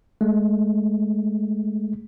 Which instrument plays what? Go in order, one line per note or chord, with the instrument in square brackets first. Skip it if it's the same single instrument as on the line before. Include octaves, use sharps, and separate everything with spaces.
[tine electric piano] G#3 A3